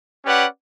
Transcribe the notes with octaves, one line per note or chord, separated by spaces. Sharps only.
C#4 G4 B4 D5 F#5